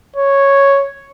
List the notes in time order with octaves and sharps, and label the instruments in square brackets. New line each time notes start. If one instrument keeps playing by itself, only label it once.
[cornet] C#5